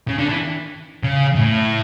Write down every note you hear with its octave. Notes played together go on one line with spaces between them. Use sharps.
C#3
D3
E3
C#3
A2